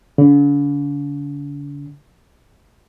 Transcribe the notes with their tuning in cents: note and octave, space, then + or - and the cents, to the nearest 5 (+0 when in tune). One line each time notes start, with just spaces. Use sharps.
D3 -45